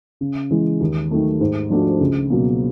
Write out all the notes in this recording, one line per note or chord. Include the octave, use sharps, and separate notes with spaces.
C#3
E3 G#3
D#2
D#3 F#3 A3
G#2
F3 A3 D4 F#4
C#2
B2 F#3 A#3